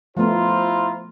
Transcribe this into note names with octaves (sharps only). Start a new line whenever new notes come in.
F3 A3 B3 E4 F4 C5 A#5